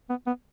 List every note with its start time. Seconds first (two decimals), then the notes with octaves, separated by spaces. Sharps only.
0.09 B3
0.27 B3